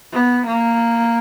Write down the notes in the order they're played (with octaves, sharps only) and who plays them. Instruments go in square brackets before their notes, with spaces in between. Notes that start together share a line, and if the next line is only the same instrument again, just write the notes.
[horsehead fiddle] B3
A#3